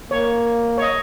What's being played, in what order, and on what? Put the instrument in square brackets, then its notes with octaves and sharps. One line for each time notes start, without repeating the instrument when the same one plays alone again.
[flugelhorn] A#3 [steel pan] C#5
[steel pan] C#5
D#5